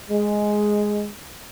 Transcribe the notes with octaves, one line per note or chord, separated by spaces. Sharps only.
G#3